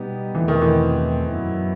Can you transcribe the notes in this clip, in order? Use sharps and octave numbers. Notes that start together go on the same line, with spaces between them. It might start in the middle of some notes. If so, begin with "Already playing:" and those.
Already playing: B2 G3 B3 D#4 G4
E2 B2 E3 A3 C4
D#3
E3
F#2 F#3 B3 E4